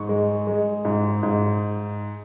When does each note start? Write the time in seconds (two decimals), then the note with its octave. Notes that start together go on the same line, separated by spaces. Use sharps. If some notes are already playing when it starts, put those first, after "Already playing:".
Already playing: G#2 C#6
0.09 G#3
0.47 G#3
0.85 G#2
1.23 G#2